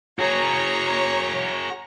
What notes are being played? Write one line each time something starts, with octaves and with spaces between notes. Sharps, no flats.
F#4 G#4 C#5 A#5